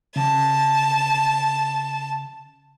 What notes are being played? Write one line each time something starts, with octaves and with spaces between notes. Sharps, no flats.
C#3 A5